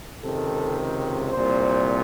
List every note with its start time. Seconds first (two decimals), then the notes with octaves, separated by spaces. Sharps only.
0.24 C#2 C3 D#3 A4
1.32 C2 A#2 C5